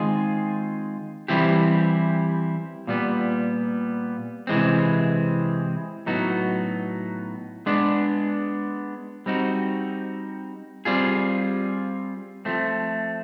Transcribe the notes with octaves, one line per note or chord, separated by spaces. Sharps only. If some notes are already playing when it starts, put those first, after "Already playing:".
Already playing: D#3 G#3 C4 F4 G#4
E3 G3 C4 E4 G4
A#2 G3 B3
C3 E3 G#3 C4
A2 F#3 B3 D#4 F#4
G#3 B3 D4
G3 C4 D#4 F#4
G3 C4 F4 G#4
F3 A3 C4